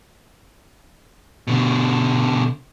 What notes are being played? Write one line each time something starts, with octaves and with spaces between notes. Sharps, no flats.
B2 D3